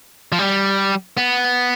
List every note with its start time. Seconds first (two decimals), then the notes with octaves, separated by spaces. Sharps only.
0.32 F3
0.39 G3
1.17 B3